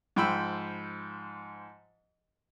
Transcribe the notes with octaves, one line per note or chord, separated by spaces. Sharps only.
G#2 F3 G5 B5 E6